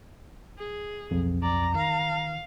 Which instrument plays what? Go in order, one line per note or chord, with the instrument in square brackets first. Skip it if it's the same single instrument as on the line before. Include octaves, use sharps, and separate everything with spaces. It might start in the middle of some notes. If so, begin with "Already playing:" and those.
[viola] G#4
[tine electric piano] B1 F2
[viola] D5 [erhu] A#5
[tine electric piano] D#3 [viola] F5